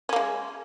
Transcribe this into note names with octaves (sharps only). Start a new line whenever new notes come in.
G#3 A#3 C#4